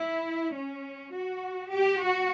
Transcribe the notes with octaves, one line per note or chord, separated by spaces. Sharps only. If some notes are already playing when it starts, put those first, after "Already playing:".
Already playing: E4
C#4
F#4
G4
F#4